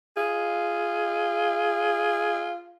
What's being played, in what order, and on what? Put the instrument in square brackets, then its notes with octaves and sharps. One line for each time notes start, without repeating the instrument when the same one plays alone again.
[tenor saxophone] F4 [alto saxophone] G#4